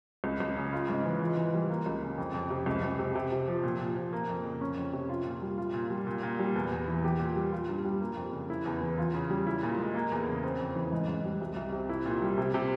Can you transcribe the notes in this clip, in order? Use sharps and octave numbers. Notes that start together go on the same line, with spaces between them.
C#2
C#2
C#3
F4
G#2
E3
F4
E3
G3
A#3
C#2
C#3
F2
F2
C3
C#2
C#2
C3
C3
C3
F3
A#2
A#2
F3
A#3
F2
C#3
C#4
F2
C3
F4
A#2
G3
F4
A#2
G3
A#2
A#2
G3
E2
E2
E3
G4
A#2
G3
F4
G2
G3
A#3
F2
C#3
E4
E2
E3
F4
C#3
G3
E4
A#2
G#3
A#3
E2
C#3
C4
F2
E3
G#2
G#2
G3
C2
C2
C3
E4
A#2
G3
C3
C3